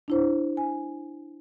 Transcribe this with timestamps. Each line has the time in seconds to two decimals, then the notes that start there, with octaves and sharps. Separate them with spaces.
0.08 D4 E4 C5
0.57 G#5